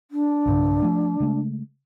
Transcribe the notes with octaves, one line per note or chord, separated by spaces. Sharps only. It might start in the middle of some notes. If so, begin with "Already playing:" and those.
D4
B1 G2 C#3
F3 A3
C#3 G#3 A3